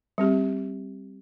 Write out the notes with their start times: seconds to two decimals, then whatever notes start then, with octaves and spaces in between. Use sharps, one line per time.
0.18 G3 C4 G4